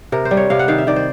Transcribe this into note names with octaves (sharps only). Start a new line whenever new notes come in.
C3 A#4
C5
G3
C#5
C3 F5
F#5
D#3 F5
E5
D#3 D5
C5